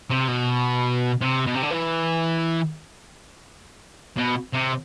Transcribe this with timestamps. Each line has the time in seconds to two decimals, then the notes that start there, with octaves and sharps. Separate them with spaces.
0.10 C3
0.28 B2
1.21 C3
1.47 B2
1.55 C3
1.62 D3
1.70 E3
4.17 B2
4.53 C3